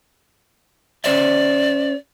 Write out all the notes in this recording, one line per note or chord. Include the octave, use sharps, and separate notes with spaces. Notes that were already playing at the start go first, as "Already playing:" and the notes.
C#4 C5 D5 E5